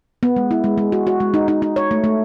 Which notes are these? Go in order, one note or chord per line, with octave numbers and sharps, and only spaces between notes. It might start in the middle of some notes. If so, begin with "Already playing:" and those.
B3
G#3
E4
G#3
G#3
F#4
F#4
G#3
D#4
D#4
D#4
C#5
A3
A3